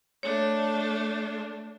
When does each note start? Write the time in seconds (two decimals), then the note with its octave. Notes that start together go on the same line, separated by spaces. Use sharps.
0.23 A3 D4 C#5